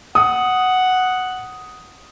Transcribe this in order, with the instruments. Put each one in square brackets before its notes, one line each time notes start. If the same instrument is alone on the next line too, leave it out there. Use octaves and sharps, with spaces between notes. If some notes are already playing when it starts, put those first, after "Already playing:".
[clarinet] F#5 [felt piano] D#6